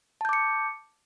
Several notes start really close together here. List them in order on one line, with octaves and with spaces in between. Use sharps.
A5 G6 D6 C#7